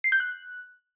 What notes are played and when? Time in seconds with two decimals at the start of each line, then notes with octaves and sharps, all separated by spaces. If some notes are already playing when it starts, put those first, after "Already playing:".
0.04 C7
0.12 G6
0.20 F#6